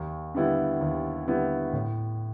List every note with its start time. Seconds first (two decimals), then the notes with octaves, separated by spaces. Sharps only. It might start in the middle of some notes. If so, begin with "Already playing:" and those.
Already playing: D#2
0.34 D3 G3 B3 E4
0.80 D#2
1.27 D3 G3 B3 E4
1.73 A2